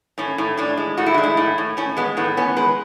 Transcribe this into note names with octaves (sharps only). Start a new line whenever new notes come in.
A2 C#4
A2
A2 D4
G#3
A2 F#4
E4
G#3 D4
E4
A2
A2
A2 C#4
G#3 B3
A2 B3
B3 C#4
G#3 B4